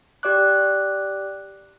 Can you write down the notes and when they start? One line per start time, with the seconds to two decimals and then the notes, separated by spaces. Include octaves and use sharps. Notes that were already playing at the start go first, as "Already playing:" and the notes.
0.23 G4 D5 D6 F#6